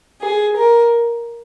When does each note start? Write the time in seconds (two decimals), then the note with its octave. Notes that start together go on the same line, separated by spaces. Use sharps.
0.21 G#4
0.57 A#4